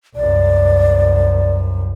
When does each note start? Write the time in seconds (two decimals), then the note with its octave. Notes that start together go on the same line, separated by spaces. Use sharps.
0.16 C2 F#2 D5